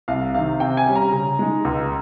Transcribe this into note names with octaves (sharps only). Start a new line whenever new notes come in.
C2 F5
C3 D#3 F5
C3 G5
G#5
G3 C#4
A#5
C#3
G#3 D#4
C#2